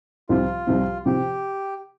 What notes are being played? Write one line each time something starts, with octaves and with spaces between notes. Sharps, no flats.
C2 C3 F3 C4 F4
C2 C3 F3 C4
C3 F3 C4 G4